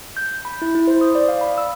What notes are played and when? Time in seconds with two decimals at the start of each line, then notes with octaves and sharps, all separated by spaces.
0.17 G6
0.45 B5
0.62 E4
0.75 E4
0.87 C5
1.01 D#6
1.15 D5
1.28 F5
1.41 B5
1.58 E6